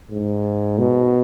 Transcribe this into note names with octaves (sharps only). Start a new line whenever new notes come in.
G#2
B2